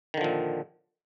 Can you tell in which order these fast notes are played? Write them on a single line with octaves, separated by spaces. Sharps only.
D#3 D3 F3 A#2